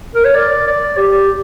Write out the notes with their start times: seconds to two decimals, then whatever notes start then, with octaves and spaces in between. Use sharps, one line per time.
0.15 A#4
0.25 C#5
0.35 D5
0.67 D5
0.97 G4